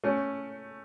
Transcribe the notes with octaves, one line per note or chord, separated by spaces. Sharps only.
A3 C#4